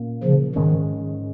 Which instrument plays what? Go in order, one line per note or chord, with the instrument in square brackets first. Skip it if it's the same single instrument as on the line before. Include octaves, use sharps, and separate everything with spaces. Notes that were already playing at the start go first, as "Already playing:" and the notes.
Already playing: [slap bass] A#2 A#3 C#4
[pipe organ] C#3 F3
[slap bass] G#2 G#3 C#4 [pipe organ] D#3